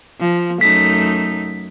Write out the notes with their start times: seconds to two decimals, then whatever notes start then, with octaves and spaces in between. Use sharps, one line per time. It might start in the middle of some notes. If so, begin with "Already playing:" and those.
0.20 F3
0.61 F#2 A3 D#4 B6